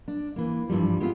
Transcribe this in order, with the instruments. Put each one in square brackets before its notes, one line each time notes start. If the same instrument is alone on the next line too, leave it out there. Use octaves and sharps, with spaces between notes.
[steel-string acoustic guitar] D4
E3 A#3
G2 E3 F3 G3
G#3 B3 C4 E4 F4